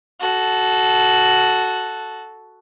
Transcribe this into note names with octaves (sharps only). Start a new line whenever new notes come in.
F#4 A4